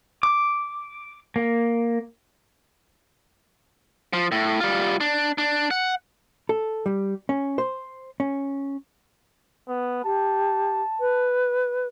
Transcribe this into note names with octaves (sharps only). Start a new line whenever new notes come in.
D6
A#3
F3
A2
G3 F4
D4
D4
F#5
A4
G3
C#4
C5
C#4
B3
G4 A5
B4